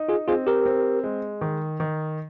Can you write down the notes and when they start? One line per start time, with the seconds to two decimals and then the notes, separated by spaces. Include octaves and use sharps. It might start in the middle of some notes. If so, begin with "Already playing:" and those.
Already playing: D#4
0.08 F4 G#4
0.28 C4 F4 G#4
0.47 G4 A#4
0.65 C4
1.04 G#3
1.41 D#3
1.80 D#3